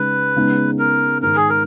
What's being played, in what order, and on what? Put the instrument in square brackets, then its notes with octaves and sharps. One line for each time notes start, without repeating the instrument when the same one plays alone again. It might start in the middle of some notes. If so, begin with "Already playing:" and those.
Already playing: [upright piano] C#3 G#3 D#4 [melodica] B4
[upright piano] C#3 G#3 B3 D#4
[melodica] A#4
[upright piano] G#2 D#3 G#3 [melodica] A#4
[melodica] G#4
A#4